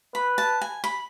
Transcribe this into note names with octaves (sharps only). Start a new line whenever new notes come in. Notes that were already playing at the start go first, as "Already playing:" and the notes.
B4 B5
A5
G#5
B5